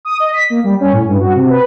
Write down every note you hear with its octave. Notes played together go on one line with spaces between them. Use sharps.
D#6
D#5
B6
A#3
G3
C#4
A2
G2
F#4
C3
B4